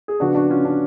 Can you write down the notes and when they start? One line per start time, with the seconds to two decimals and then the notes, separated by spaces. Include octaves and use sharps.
0.08 G#4
0.20 C#3 F3 B3 D4 F#4
0.35 D4 F#4
0.50 C#4 F4
0.65 D4